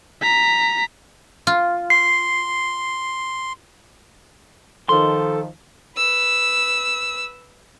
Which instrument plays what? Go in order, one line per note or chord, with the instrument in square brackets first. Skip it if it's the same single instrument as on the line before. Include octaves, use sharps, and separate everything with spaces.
[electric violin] A#5 B6
[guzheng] F4
[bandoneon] C6 [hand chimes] C7
[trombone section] D#3 F3 [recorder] A4 [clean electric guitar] C6
[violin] B4 E6